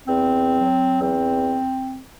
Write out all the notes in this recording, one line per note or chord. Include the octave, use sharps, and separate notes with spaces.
E2 C4
F#3
E2 C4